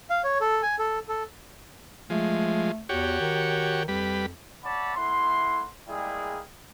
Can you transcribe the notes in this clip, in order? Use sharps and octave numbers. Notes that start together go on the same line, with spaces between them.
F5
C#5
A4
G#5
A4
A4
F3 G#3 A3
E2 F#4 G4 C#5
D#3
F2 G3 B4
C#5 D5 E5 F#5 A5 B5
A3 E4 F#5 C6
G3 G#3 A#3 E4 G#4 G5